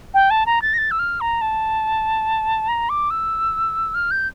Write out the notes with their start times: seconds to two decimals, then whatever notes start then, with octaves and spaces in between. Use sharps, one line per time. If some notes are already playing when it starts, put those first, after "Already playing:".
0.14 G5
0.30 A5
0.46 A#5
0.62 A6
0.74 A#6
0.78 A6
0.91 E6
0.99 F6
1.21 A#5
1.41 A5
2.69 A#5
2.89 D6
3.10 E6
3.95 F6
4.11 G6